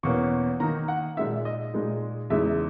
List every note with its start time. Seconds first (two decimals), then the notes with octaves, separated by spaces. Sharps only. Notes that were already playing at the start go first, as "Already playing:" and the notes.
0.03 E2 B2 A#3 C#4 C#6
0.60 D#3 A#3 D#4 A#5
0.88 F#5
1.17 A#2 G#3 D#4 E5
1.45 D#5
1.73 A#2 G#3 D#4
2.30 E2 C#3 G#3 D#4 E5